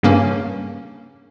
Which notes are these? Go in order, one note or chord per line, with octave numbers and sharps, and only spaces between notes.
G2 C#3 A#3 C#4